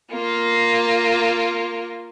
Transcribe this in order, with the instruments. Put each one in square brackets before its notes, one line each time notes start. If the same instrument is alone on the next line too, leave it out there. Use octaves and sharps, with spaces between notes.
[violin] A#3 F4